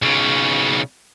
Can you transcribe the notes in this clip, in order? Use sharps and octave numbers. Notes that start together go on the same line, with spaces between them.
B1 C#3